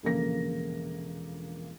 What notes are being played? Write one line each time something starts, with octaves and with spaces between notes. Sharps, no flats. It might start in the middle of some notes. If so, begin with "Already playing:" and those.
E1 A#1 C#3 A#3 A4 A#6